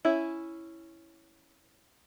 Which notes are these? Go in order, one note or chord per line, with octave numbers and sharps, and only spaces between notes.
C#4 E4